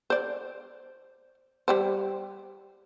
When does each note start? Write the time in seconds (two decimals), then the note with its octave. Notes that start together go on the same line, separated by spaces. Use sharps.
0.10 C5 D5
1.68 G3 G4 C5